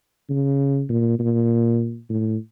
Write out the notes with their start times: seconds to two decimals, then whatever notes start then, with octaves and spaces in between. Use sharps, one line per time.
0.30 C#3
0.89 A#2
1.19 A#2
2.09 A2